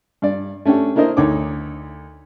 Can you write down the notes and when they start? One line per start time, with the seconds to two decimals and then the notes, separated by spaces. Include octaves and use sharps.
0.22 G2 D5
0.65 A3 C#4 D4 G4
0.96 A#3 D4 E4 A#4 C5 D#5
1.17 D2 D#4 C#5 D6